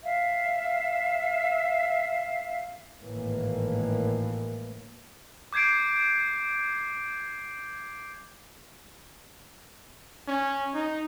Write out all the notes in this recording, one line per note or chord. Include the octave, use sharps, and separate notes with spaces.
E5 F5
G#1 A2 E3 A#3
D6 G6 G#6 C7 D7
C#4
D#4